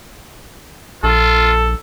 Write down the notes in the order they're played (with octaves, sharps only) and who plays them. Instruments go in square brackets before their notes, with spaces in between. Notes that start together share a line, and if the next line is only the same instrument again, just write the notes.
[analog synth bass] A#1 [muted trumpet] F4 [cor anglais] A4